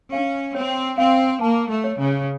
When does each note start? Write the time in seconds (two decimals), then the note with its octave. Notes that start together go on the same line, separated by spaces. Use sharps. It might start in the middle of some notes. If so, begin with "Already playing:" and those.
0.12 C#4 F5
0.55 C4 C#5
0.98 C4 F5
1.41 A#3 A5
1.69 A3
1.84 C#5
1.97 C#3